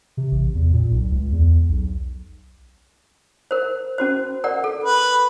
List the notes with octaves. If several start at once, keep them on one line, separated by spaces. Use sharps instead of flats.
C3
A1
E2
A#2
B1
C#2
E2
B1
A#4 C5
C#4 F#4 C5
A#4 D5 F#5
A4
B4